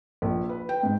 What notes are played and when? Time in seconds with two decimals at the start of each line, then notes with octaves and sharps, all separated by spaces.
0.22 A#1
0.49 B4
0.69 G5
0.83 G#2